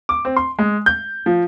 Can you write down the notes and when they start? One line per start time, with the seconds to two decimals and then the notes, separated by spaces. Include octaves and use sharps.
0.09 D6
0.25 C4
0.36 C6
0.59 G#3
0.86 G6
1.26 F3